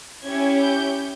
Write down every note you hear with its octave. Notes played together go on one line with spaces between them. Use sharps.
C#4 E4 G4 G#6
G6